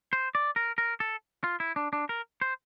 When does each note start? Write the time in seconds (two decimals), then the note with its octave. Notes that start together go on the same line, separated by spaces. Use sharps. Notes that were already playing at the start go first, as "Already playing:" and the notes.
0.13 C5
0.35 D5
0.56 A#4
0.78 A#4
1.00 A4
1.44 F4
1.60 E4
1.76 D4
1.93 D4
2.09 A#4
2.41 C5